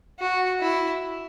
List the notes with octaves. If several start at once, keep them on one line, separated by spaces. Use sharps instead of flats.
F#4
E4